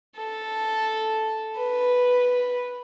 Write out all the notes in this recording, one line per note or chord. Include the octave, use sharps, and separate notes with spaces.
A4
B4